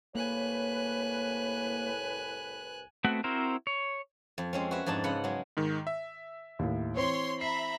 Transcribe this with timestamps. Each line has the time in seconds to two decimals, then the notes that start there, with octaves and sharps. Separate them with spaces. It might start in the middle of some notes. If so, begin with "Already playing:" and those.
0.15 C2 A2 A#3 B4 C#5 G#5 F#6
3.04 A3 B3 C4 F#4 F#5
3.24 C4 E4 F#4 A#4 C5
3.67 C#5
4.38 F2
4.53 G#3 C4 C#4
4.71 F#4 B4 E5
4.86 F2 G#2 D4 D#4 A5
5.04 C#3 B3 F#5 B5
5.24 F#3 G#3
5.57 G#2 D#3
5.87 E5
6.59 D#2 A2
6.97 E3 C4 C#5 C6
7.41 E5 A#5 B5 C7